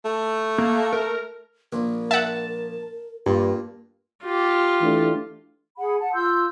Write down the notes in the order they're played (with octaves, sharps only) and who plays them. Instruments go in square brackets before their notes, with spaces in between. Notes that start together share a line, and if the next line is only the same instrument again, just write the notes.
[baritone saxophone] A3
[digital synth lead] A#3
A#4
[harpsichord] A#1 [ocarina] A#4
[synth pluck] E5 F#5 [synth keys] A5
[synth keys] G2 [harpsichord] A#2
[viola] F4 G4
[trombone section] E3 A3 D4
[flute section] G#4 F#5 B5
F#5 A5
F4 C6 E6 G6